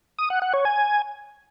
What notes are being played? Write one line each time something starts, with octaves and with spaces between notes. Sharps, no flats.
D#6
F#5
F#5
C#5
G#5